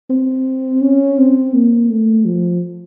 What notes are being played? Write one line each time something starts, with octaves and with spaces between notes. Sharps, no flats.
C4
C#4
C4
A#3
A3
F3